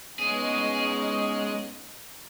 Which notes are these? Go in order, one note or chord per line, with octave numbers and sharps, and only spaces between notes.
G#3 B3 C#4 D#4 G#4